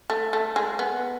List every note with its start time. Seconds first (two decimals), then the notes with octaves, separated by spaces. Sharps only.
0.10 A3
0.33 A3
0.56 G#3
0.79 B3